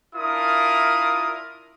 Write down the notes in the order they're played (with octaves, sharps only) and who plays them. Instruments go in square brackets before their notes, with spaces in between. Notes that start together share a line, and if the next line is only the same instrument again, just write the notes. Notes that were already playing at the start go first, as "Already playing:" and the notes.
[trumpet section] D4 E4 F4 A#4 D#6